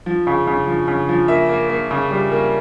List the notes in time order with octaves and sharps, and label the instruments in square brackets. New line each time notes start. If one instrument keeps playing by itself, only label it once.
[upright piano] F3
C#3
C#3
F3
C#3
F3
A#3 E5
A#3
A#3
C#3
G3
A#3